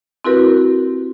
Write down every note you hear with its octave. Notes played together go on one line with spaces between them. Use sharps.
C4 E4 F#4 G4 A#4 B4